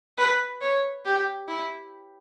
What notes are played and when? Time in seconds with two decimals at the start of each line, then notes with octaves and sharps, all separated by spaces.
0.18 B4
0.61 C#5
1.05 G4
1.48 E4